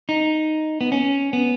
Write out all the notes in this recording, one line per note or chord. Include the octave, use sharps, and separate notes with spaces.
D#4
B3
C#4
B3